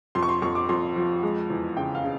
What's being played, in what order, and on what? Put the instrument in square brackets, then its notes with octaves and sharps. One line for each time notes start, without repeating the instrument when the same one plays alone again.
[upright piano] F2 C6
C#6
C6
F2 C#6
D6
F2 C6
F3
G#3
E2
C#3 G5
F5
C#3